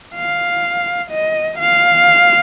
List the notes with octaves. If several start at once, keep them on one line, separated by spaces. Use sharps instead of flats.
F5
D#5
F5